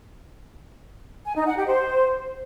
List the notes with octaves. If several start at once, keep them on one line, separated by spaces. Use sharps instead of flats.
G#5
D#4
F#5
G4
C5